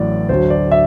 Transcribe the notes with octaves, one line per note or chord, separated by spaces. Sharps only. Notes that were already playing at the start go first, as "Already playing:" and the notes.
Already playing: A1 A2 F#3 D5
D2 D3 F#3 C5
D5
E5